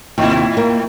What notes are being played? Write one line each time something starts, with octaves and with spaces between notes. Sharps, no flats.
D#2 A2 C3 E4
A#3